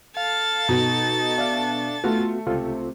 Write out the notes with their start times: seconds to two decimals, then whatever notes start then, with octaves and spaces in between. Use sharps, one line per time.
0.17 A4 F5 A6
0.69 B2 D#4
1.38 D4 E5 F5
2.04 A3 B3 F4 F#4
2.47 C#2 C3 F4 A4